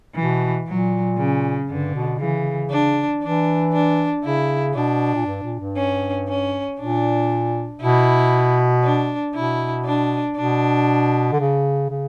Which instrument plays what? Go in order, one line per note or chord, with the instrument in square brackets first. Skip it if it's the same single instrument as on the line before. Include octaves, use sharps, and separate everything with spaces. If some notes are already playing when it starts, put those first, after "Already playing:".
[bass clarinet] B2 [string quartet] E3
[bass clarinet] A#2 [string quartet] F#3
[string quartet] C#3
[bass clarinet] G2 [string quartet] D3
[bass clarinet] B2
[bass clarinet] C#3 [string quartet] E3
[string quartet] D4
[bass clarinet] E3 [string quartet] D4
[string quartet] D4
[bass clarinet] C#3 [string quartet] E4
[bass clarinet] B2 [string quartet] D4
[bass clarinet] A#2
G2
A#2
G2
[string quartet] C#4
C#4
[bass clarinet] A#2 [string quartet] D4
[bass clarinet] B2 [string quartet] E4
[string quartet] D4
[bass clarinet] B2 [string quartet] E4
[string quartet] D4
[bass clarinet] B2 [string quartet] D4
[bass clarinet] D3
C#3
C#3